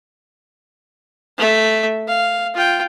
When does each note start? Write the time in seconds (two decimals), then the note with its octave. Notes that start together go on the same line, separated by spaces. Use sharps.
1.38 A3 E5
2.08 F5
2.54 F4 G5